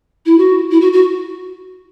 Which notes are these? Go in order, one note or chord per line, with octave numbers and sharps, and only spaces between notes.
E4
F#4
E4
F#4
F#4